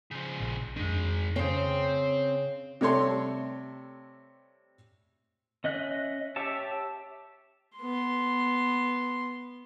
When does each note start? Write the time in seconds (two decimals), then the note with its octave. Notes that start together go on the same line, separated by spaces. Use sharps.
0.11 C#3 F3
0.40 A#1
0.76 F2 D#3 G#3 D4
1.36 C#3 C4 C#4 C5
2.81 C3 G3 A3 C#5 A5 C6
5.64 C#4 D#5 E5 F#6
6.36 G4 C#5 E5 A5
7.78 B3 C6